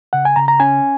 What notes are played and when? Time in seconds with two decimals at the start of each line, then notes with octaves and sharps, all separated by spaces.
0.13 C#3 F#5
0.25 G#5
0.36 C#3 A#5
0.48 A#5
0.60 C#4 G#5